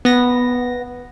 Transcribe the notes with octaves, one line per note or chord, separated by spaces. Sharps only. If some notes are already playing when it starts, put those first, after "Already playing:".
B3 A#6